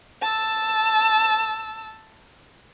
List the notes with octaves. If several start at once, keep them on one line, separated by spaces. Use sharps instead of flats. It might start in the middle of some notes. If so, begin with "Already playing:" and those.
A5 E6